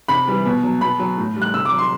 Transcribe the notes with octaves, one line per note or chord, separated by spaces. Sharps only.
C3 B5
E3 G3
B2
F#3
B2 B5
F#3
A2
G3
F#6
C3 E6
D6
F#3
C6